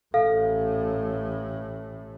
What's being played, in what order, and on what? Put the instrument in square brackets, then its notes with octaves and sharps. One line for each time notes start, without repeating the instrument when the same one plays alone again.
[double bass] A1 A2 [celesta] A4 F5